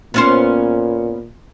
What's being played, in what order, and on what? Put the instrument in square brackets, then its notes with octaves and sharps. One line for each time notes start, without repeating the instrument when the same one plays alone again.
[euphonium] A#2 [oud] B3 C#4 C5